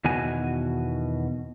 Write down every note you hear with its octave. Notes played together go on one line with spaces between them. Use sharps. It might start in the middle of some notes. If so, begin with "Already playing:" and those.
E2 B2 D#3 F#4 G#5